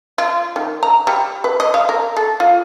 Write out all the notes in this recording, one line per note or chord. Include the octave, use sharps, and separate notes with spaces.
F4
D#3
A#5
G3
B4
D#5
F5
A#4
A4
F4